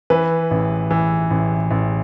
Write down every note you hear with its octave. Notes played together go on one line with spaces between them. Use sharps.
E3 B4
A1
E3
A1
A1